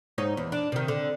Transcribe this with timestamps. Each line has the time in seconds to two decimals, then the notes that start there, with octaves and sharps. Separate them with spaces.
0.18 G#2 D#4 C#5
0.37 E2
0.52 D4
0.72 C3 D#3
0.88 D3